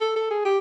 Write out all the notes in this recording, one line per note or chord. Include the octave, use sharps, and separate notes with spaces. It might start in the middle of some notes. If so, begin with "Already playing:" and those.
A4
A4
G#4
G4